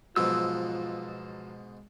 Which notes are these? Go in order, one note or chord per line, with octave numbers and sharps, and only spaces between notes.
G#2 B2 F3 F#3 F4 E6